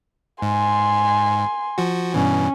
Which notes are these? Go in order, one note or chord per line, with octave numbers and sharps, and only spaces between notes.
G#2 G#5 C6
F3 F#4
G2 B2 E3 C#4